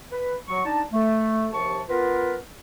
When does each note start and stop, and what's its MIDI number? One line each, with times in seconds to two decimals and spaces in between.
0.12 0.35 71
0.48 0.61 54
0.48 0.61 85
0.65 0.82 62
0.65 0.82 63
0.65 0.82 81
0.93 1.47 57
1.53 1.79 39
1.53 1.79 48
1.53 1.79 53
1.53 1.79 81
1.53 1.79 85
1.89 2.35 59
1.89 2.35 65
1.89 2.35 70
1.89 2.35 71